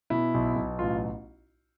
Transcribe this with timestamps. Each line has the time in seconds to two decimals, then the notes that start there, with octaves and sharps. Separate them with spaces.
0.10 B2 E4
0.34 B1
0.56 B1
0.79 A1 F4